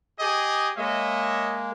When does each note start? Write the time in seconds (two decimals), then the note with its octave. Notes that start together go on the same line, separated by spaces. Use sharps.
0.19 G4 G#4 D#5
0.78 G#3 A#3 C#5 D#5 E5